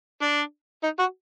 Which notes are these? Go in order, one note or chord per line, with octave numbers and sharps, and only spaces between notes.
D4
D#4
F#4